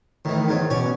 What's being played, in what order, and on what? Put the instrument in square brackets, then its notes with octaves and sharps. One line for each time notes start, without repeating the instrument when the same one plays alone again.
[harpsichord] A2 E3 [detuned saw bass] D#3
[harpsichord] E2 G#2 F#3
[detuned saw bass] B2 [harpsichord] C#4 C#5 D5